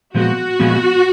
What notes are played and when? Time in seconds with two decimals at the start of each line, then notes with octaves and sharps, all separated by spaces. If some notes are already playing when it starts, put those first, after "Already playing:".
0.14 A#2 F3 G#3 B3 F#4
0.60 A#2 F3 G#3 B3